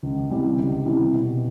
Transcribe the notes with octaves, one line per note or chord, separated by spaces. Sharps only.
C#2
C3 E3 G3 C4
C#2
C3 E3 G3 C4
B2